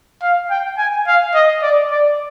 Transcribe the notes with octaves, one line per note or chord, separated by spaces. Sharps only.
F5
G5
G#5
F5
D#5
D5
D5